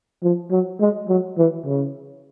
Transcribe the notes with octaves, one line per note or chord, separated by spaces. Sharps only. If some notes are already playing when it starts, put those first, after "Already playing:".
F3
F#3
G#3
F#3
E3
C#3